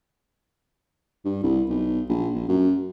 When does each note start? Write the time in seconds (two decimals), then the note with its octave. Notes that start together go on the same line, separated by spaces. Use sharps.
1.25 G2
1.43 C2
1.69 B1
2.09 A#1
2.34 A#1
2.49 F#2